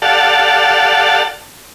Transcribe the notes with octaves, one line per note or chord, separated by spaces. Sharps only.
G4 A4 D5 F5 F#5 A5